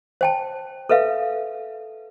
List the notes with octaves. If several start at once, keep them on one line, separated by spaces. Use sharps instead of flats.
C5 G5 A5
A4 B4 E5 F5